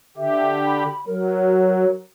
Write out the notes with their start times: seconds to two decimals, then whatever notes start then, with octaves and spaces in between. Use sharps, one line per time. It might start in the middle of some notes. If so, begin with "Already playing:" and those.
0.17 D3 G4 E5
0.67 B5
1.07 F#3 A#4